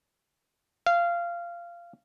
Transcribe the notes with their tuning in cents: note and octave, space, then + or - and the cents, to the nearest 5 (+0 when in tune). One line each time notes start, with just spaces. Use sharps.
F5 -15